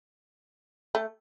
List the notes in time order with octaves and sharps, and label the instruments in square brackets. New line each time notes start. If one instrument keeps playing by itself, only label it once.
[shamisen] A3